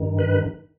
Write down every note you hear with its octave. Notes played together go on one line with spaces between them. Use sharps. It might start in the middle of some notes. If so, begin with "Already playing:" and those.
Already playing: G2 D#3
B4